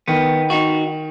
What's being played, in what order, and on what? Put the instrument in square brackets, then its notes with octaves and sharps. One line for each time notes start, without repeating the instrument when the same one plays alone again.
[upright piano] D#3 [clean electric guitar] B3
[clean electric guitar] D#4 F#4